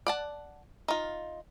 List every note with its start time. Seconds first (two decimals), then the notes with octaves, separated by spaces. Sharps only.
0.07 D5 F#5 A5
0.88 D#4 F4